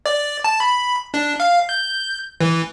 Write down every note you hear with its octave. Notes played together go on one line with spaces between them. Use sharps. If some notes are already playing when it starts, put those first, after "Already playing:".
D5
A5
B5
D4
F5
G6
E3